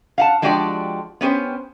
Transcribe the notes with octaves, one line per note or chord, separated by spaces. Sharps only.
F5 F#5 A5
F3 G#3 D4 F#4 G4 D5
B3 C#4 G4 C5